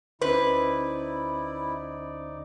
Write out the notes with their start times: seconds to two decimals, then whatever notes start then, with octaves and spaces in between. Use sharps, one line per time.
0.22 D2 C#4 D#4 E4 B4 C5 D5